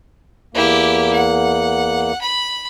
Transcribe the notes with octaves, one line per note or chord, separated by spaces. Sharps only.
E2 A#3 E4 G4
F#5
B5